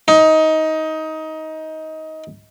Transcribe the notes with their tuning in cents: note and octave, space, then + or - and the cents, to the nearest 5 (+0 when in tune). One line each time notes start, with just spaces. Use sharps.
D#4 +20